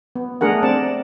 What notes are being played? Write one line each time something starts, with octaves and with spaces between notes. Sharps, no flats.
B3
A3 D4 G#4 A#4 F#5
C4 D5 A5